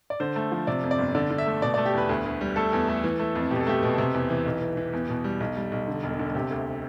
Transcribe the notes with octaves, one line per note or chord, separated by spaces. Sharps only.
D5
D3 C5
A3
F3
C3 D5
F2
D5
G1
D3 D5
D3
E5
A3
B2 D5
A3 D5
G4
E2 B4
D2
D2
G3
A3 A4
E2
A3
E3
A3
F2
B2 G4
A4
A3 G4
B2
C3
E2
E3
B1
E3
E3
E2
B2
G3
B1
G3
B1
D3
E1
D3
C3 G4
D2